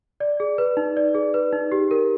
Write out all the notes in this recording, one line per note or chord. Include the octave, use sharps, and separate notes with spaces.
D5
G#4
B4
D#4
D5
G#4
B4
D#4
G4
A#4